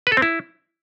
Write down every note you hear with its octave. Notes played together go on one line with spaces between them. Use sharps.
B4
A4
C4
E4